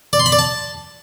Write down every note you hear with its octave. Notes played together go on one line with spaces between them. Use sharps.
D5
C6
B5
D5
A5